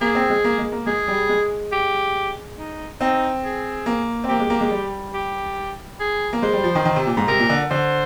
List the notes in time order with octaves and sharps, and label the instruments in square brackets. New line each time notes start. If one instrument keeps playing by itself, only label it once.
[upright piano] A#3 [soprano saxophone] G#4
[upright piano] C4
G#3
A#3
G#3
A#3
[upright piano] G#3 [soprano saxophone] G#4
[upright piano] G3
G#3
[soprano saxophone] G4
D#4
[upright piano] C4 [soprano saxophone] D#4
[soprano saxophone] G#4
[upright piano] A#3
C4
[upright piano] A#3 [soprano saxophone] G4
[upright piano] G#3
A#3
G#3
G3
[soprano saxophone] G4
G#4
[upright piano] A#3
[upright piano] G#3 [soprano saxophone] C5
[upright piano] G3
F3
D#3
D#3
C3
A#2
G#2
[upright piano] C3 [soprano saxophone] A#4
[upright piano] A#2
D3
[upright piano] D3 [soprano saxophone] C5